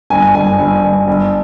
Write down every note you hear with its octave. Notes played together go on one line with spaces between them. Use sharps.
G1 G#5
G1 G#5
G1
G1
G1